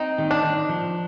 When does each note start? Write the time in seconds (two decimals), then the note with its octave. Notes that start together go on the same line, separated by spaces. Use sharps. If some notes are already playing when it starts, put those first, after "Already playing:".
Already playing: C4 D#4
0.18 D#3
0.31 D4
0.44 D#3
0.69 F3